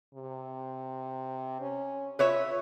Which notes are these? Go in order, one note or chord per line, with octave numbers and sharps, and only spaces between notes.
C3
C#4
F4 B4 C#5 E5